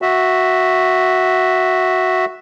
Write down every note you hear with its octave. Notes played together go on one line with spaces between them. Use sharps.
F#4 E5